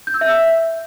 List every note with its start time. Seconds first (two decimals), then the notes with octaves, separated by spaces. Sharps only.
0.07 G6
0.14 E6
0.21 E5